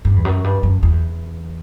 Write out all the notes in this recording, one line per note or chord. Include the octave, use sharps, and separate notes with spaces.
G2
E2
F#2
G2
F#2
E2